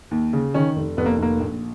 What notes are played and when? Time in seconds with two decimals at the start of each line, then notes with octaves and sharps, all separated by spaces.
0.11 D#2
0.33 C#3
0.54 D#3 C#4
0.76 F1
0.97 F1 B3
1.06 A#3
1.18 F1 A#3
1.40 A#1